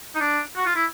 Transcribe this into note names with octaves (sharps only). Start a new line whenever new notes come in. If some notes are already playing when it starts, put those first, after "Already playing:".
D#4
D4
F#4
F4
E4